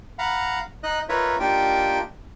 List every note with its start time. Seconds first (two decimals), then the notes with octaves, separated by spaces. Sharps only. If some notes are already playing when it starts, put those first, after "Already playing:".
0.19 F5 F#5 A#5 B5
0.83 D#4 D#5 F#6
1.09 D#4 F4 A#4 B4 C#5 E5
1.40 A#3 D4 D#4 F4 G4 G5